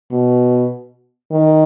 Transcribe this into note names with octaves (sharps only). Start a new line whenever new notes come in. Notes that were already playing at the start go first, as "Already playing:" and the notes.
B2
D#3